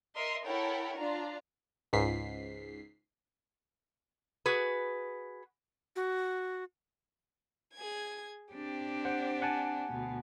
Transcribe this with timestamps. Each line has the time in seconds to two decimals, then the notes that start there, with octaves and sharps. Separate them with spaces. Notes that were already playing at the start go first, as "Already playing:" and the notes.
0.16 A#4 D#5 E5 C6
0.46 E4 A4 A#4 C#5 F#5 G5
0.96 D4 F4 A#5
1.93 C#2 G#2 B6 C7
4.46 F#4 G#4 B4
5.96 F#4
7.74 G#4 G#6
8.53 C4 D4 G4
9.05 C5 F#5
9.42 F#5 G#5 A5
9.92 D2 B2